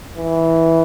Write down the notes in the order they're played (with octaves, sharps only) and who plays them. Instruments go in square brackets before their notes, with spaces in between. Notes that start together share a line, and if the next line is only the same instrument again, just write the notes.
[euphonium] E3